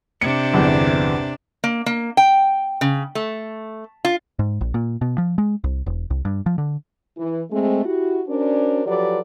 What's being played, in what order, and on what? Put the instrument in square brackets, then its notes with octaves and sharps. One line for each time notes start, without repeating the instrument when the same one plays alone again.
[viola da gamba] C3 D4 [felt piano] C#7
[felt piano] G1 E2
[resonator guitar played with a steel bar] A#3
A#3
G5
C#3
A3
F4
[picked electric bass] G#2
A#1
A#2
B2
F3
G#3
C2
E1
C2
G2
F3
D3
[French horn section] E3
G#3 A3 C4
E4 F#4 G4
C#4 D4 F#4 A#4 C5 D5
F3 F#3 G4 A4 B4 D5